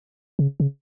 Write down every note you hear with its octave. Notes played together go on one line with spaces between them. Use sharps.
C#3
C#3